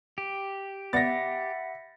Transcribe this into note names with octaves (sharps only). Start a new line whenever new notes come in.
G4
C#2 B3 D5 E5 F#5 B5 A6 A#6